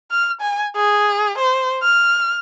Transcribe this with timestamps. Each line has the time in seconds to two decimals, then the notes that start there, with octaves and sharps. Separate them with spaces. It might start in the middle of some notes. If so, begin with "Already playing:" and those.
0.11 F6
0.41 G#5
0.76 G#4
1.38 C5
1.82 F6